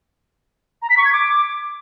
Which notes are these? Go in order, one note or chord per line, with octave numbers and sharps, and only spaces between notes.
A#5
B6
C#6
G#6
D6